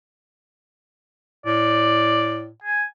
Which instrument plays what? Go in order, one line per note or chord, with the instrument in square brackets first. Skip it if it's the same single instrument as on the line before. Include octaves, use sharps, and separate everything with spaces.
[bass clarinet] A2 [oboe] D5
[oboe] G#5